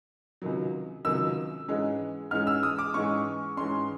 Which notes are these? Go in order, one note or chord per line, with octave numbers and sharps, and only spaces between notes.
C#2 C3 D#3 F#3
C#2 C3 D#3 F#3 E6
G#2 E3 G#3 C#4
G#2 E3 G#3 C#4 F6
E6
D#6
D6
G#2 E3 G#3 C#4 C#6
G#2 E3 G#3 C#4 C6